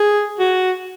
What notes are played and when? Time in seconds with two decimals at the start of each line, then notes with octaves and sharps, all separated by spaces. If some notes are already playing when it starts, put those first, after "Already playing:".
Already playing: G#4
0.39 F#4